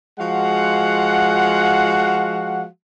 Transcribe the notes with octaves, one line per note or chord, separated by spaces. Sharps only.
F3 G#3 F#4 F5 F#5